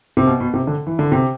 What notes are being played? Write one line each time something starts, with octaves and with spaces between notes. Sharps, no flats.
C3
B2
B2
C3
D3
E3
D3
C3